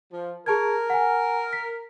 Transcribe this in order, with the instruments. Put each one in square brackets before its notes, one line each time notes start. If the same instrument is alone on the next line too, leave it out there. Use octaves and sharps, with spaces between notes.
[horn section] F3
[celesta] G#4 A5 G#6 [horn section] A#4
[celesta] F#5 G#5
B6